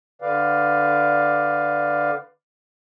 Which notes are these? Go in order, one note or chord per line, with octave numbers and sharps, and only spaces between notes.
D3 B4 D5 F5